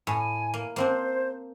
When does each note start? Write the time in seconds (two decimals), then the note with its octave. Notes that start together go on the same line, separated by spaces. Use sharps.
0.07 A2 G#5
0.54 A#3
0.76 A#3 C4 D4 C5